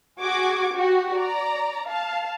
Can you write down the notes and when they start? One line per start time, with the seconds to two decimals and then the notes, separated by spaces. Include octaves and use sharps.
0.21 F#4 G#4 D6 G#6
0.73 F#4 G4
1.17 D5 A#5
1.88 F5 A5